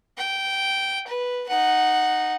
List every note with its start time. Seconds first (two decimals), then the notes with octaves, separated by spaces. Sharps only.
0.17 G5
1.07 B4
1.48 D#4 F#5